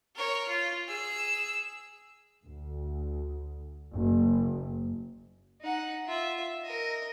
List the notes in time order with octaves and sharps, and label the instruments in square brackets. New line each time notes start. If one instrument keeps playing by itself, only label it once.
[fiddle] A#4 C#5
F4
G#4 E6
[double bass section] D2
F#1
[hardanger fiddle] D#4 F#5
F4 E5
A#4 D#5